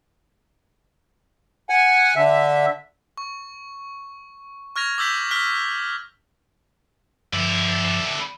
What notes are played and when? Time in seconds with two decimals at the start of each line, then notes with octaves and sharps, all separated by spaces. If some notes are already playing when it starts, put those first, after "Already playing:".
1.69 F#5 G#5
2.16 D3 E5
3.17 C#6
4.76 C#6 F6 G#6 A#6 F7
4.98 D6 E6 G6 B6 F#7
5.31 F6 B6 G7
7.33 G2 D3 F3 E4